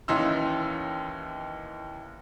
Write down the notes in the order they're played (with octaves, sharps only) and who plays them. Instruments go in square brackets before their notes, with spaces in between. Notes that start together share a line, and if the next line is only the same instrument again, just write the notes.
[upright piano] D#2 E3 C#4 D#4 C6 E6